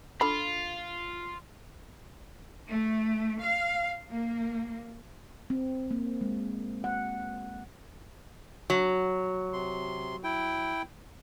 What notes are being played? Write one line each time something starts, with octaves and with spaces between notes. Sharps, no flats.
D3 F4 B5
A3
F5
A#3
C4
A#3
G#3
F#5
F#3
C3 C6
E4 G5